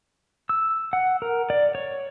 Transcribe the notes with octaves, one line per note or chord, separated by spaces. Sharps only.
E6
F#5
A#4
D5
C#5